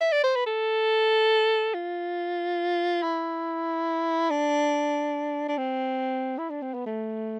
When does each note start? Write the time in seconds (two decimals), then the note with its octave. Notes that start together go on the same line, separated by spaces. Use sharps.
0.01 E5
0.12 D5
0.24 C5
0.35 B4
0.46 A4
1.74 F4
3.03 E4
4.30 D4
5.49 D4
5.58 C4
6.38 E4
6.50 D4
6.62 C4
6.74 B3
6.86 A3